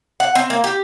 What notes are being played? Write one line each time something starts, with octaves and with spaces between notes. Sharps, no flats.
F#5
C4
A#3
G4